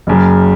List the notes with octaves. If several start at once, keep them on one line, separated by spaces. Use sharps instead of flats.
F#1 F#2 C#3